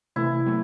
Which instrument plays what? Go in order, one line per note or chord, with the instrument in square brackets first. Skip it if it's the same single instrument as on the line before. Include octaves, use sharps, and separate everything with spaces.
[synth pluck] C3 E3 A3 [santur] E4
[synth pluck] F#3 A3